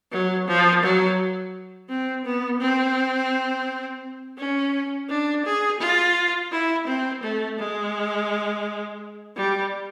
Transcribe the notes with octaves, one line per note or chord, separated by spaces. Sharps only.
F#3
F3
F#3
C4
B3
C4
C#4
D4
G#4
F4
E4
C4
A3
G#3
G3